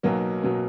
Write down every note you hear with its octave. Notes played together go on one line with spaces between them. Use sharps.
B1 B2 F#3 A#3
B2 F#3 A#3